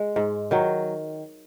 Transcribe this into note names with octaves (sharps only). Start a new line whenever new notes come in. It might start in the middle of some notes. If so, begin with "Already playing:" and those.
Already playing: G#3
G#2
D#3 F#3